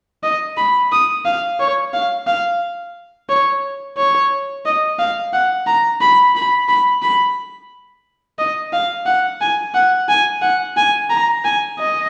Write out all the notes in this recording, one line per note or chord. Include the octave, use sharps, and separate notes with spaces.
D#5
B5
D#6
F5
C#5
F5
F5
C#5
C#5
D#5
F5
F#5
A#5
B5
B5
B5
B5
D#5
F5
F#5
G#5
F#5
G#5
F#5
G#5
A#5
G#5
D#5